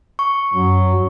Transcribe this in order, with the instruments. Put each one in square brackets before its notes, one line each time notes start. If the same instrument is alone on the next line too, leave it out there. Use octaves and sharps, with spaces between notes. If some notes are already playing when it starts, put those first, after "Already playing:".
[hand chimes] C#6
[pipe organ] F#2 [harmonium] F#3